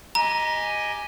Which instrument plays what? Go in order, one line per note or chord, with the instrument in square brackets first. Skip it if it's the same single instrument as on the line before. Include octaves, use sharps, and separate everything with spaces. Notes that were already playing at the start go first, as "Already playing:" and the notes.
[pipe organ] G4 D#5 G#5 [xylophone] A#5